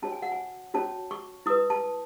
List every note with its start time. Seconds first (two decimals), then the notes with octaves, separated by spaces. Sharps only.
0.02 C#4 F#4 C#5 A5
0.12 G#5
0.22 F#5
0.32 G#5
0.74 C#4 F#4 C#5 A5
1.11 C#6
1.46 E4 B4 D#6
1.70 A5